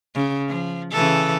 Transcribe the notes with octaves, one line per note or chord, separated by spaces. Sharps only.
C#3
F3
C#3 E3 A4